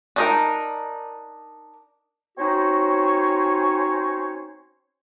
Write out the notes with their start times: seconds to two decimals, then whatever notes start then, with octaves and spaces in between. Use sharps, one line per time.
0.16 D4 D#4 A#4
2.38 C4 C#4 D#4 F#4 C5 C#5